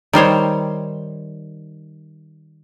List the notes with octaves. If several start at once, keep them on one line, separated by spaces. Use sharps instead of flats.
D#3 G3 C5 C#5